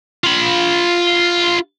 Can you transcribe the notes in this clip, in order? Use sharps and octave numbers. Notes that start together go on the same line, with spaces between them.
F4 B5